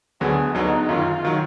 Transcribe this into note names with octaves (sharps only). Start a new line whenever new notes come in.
D2 D3 F#3 B3 G#4
D2 D3 F#3 B3 D#4
F#2 D#3 F#3 F4
D#3 F#3